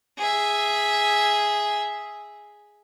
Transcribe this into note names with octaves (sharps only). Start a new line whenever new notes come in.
G#4 E5